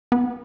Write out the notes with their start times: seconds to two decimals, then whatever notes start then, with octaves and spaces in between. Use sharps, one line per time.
0.12 B3